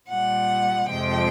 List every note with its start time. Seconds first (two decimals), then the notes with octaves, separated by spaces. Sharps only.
0.10 A#2 G3 F#5
0.90 F2 C3 F3 G#3 G5